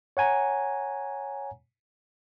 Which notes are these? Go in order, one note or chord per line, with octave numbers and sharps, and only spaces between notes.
C#5 F#5 G#5 A#5